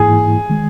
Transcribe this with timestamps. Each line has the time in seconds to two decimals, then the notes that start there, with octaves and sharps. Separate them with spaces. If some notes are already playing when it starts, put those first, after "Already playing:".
Already playing: G#2 E3 A#3 E4 G#4
0.50 D#3 G#3